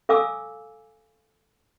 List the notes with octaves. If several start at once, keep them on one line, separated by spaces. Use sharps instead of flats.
A4 F5 G#5 D6 E6